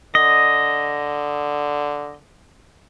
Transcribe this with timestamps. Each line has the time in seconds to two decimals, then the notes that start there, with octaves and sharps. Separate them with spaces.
0.15 D3 D#5